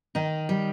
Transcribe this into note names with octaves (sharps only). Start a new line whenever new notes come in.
D#3 D#4
G3